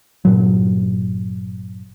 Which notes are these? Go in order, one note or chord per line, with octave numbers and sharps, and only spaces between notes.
G1 A#2 F#3